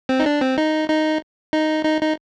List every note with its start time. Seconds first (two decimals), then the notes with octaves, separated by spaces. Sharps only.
0.09 C4
0.19 D#4
0.26 D4
0.41 C4
0.58 D#4
0.89 D#4
1.53 D#4
1.85 D#4
2.02 D#4